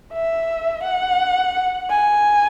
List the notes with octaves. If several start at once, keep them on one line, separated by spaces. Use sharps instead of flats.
E5
F#5
G#5